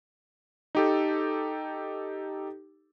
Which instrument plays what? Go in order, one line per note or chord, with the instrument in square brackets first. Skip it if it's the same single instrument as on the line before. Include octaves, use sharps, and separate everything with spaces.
[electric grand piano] D#4 G4 A4